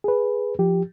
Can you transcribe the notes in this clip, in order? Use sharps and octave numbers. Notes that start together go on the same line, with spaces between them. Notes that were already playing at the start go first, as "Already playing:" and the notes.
G#4 B4
F3 G4